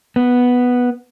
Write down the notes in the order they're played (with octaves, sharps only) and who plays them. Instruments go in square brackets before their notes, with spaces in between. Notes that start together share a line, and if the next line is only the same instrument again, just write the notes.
[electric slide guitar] B3